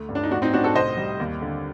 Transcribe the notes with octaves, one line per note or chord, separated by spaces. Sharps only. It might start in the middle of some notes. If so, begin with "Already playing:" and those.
Already playing: D2 A3
G2
D4
D#4
A2 D4 F#4
C4 D#4
A2 D4 F#4
F#4 A4
C2 C5 D#5
G3
D#2
D3